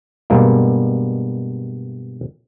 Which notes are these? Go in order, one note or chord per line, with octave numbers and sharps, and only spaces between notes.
G2 B2 G3 G#3 A#3